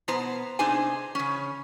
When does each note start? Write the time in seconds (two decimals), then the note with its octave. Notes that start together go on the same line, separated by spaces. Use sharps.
0.08 B2 B3 C5 A#5
0.59 C3 D4 D#4 G#4 C5 G#5
1.15 C#3 C#4